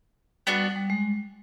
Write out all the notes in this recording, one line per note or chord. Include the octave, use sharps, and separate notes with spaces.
G3 B3 D4 F#4
G3
G#3